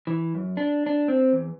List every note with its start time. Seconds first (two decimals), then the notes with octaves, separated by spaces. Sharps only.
0.07 E3
0.35 F#2
0.57 D4
0.86 D4
1.08 C4
1.33 E2